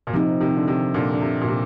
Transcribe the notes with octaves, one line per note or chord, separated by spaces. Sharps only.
A#2
C3 F3 C4 D#4
C3 D#3
D3
C3 D#3
A#2 D3
D3
C3
A#2
C3